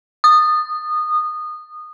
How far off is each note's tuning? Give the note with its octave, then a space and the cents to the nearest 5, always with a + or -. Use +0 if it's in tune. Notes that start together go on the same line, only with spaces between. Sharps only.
D#6 -20